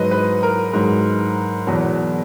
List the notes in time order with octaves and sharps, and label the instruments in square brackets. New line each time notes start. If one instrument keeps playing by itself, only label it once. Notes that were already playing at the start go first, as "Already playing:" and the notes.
Already playing: [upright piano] G#2 F#3 B4 D#5
B4
A#4
G#2 F#3
E2 B2 F#3